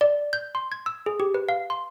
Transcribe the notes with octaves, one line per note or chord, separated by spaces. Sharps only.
D5
G6
C6
G#6
E6
G#4
G4
B4
F5
C6